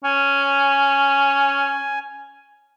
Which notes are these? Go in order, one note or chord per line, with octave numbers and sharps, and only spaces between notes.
C#4 G#5